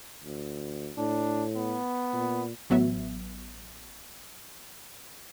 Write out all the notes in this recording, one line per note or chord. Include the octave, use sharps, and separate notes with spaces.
D2
A2 D4
B3
A#2
A1 F#3 B3 E5